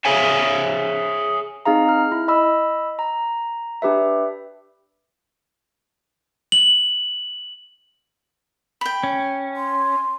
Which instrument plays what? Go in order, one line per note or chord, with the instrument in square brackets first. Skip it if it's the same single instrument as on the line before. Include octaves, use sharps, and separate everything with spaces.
[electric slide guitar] G#4 C#5 E5 F5 G#5
[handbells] C4 D#4 G#4 F5 A#5
F6
E4
D#5 B5 E6
A#5
D4 G4 B4 E5
[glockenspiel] F#7
[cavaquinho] G5 B5
[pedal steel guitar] C#4
[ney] C6